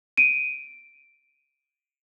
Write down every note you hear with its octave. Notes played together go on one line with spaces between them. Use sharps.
D7 D#7